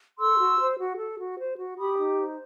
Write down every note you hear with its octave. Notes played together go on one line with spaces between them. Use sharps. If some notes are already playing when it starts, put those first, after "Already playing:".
A4 C6 E6
F#4
C5
F#4
A4
F#4
C5
F#4
G4 B5 D#6
D#4
C5